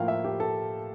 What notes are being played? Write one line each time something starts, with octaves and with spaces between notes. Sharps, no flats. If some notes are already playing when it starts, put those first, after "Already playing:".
Already playing: A2 F3 A#3 E4 F5 G5
E5
G4
A4